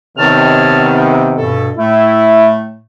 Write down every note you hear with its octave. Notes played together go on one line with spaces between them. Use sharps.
C3 D#3 B3 C#5 A5 F6
G2 B2 A4
A2 A3 E4